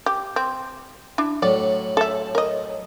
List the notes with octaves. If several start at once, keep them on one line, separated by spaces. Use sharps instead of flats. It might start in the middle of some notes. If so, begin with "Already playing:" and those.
G4
C4
D4 E4
A2 F#3 D5
A4 E5
A#4 D#5